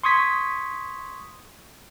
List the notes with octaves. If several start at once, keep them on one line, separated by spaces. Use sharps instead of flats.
C6 C#6 D#6 G#6 B6